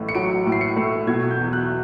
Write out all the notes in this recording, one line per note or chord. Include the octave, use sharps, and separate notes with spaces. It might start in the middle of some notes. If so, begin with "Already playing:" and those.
Already playing: A1 A2 A3
C#7
F#3 D7
A2
C7
C#7
A3
B2 G#6
G6
E2
F#6